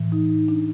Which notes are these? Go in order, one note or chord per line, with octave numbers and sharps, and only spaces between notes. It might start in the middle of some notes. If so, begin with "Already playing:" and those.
Already playing: A2 E3
D#4
D4